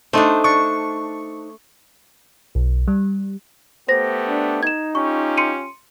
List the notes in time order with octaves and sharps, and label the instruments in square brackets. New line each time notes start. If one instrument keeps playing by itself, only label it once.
[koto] A3 D4 [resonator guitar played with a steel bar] D#4 C5
[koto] D4 [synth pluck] C#6
[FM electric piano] B1
G3
[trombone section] A3 B3 G4 [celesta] C5 A#6
[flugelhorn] D4
[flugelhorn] D#4 [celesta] G#6 E7
[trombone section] C#4 F4 G4 [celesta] C#6
[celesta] C6 C#7 D#7